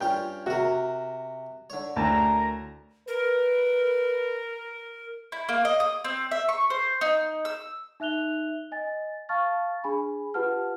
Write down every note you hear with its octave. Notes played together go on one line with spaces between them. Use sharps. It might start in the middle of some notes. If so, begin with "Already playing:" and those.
G2 C#4 F4 G5
C3 F#4 A#4
D3 C#5
D2 E4 A#4 A5 A#5
A#4 B4
E4
A#3
D#5
D#6
C4
E5
C#6
C5
D#4
E6
D#4 E5 F#6 F7 G7
D#5 G#5 A6
F5 A5 C#6 F6 A6
D4 G#4 G#5 B5
F4 G4 B4 F#5 A5 F6